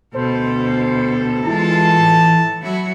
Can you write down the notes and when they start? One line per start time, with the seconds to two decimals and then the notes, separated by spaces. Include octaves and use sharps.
0.15 D2 B2 A4 C5
1.46 E3 G#3 F4 A5
2.00 A2
2.62 F#3 E4 F#4